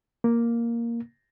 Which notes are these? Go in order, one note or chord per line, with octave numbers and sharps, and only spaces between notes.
A#3